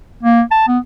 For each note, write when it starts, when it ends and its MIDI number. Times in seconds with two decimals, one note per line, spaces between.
0.23 0.42 58
0.52 0.67 81
0.68 0.79 59